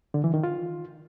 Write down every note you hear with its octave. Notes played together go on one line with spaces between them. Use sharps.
D3
E3
D#3
F4